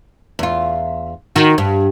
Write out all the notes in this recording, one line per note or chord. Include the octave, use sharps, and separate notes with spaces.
E2 F4
D#3 F#4
G2